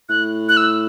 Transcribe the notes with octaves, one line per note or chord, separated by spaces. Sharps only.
A2 F#6
F#6
E6